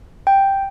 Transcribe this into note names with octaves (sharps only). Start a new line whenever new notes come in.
G5